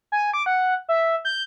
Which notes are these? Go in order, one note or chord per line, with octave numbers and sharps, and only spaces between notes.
G#5
D6
F#5
E5
G6